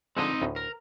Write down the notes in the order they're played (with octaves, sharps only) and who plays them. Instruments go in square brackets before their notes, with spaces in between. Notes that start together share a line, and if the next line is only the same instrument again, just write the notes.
[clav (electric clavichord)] D3 F3 G#3 [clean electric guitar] C4 D#4 D#5
[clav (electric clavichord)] D2 A2
[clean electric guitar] A#4